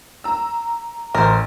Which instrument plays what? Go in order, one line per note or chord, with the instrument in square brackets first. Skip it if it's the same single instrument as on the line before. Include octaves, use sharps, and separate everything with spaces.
[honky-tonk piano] A#5 E6
[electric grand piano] A1 [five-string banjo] A#4 C5